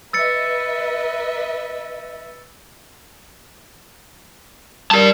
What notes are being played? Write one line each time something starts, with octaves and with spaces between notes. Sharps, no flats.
B4 D#5 E5 E6 A6 C#7
G3 G4 A#4 D5 A5